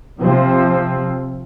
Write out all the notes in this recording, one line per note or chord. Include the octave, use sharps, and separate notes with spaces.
C3 F3 C4